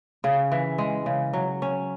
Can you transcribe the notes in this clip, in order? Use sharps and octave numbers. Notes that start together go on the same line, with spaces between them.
C#3
E3
G#3
C#3
F#3
C#4